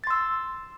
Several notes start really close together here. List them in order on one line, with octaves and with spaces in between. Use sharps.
A6 C6 E6